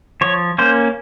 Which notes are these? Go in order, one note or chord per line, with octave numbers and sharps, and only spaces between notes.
F3 C#5
A#3 C#4 C5